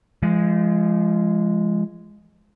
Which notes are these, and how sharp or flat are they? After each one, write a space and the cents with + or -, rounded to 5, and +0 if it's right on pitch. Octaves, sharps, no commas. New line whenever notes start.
F3 -30 G#3 +0